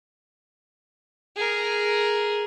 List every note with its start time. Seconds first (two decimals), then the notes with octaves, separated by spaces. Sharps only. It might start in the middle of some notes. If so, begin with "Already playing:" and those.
1.36 G#4 A#4